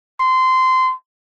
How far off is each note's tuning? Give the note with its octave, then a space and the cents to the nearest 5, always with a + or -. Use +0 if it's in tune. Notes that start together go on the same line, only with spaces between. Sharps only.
C6 -20